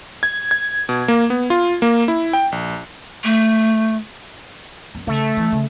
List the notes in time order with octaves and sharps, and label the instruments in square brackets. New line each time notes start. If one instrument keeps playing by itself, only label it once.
[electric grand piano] G#6
G#6
B2
A#3
B3
F4
A#3
E4
G5
A#1
[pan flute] A3
[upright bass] F#2
[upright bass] C#3 [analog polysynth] A3
[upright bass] E3
C#3